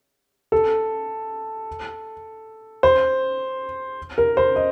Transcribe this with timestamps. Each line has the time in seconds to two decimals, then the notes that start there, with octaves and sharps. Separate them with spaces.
0.52 A4
2.83 C5
4.18 A#4
4.37 C5
4.56 D#5